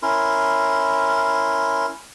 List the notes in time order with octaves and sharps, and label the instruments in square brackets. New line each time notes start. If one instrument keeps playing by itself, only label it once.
[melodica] C#4 E4 A#4 C6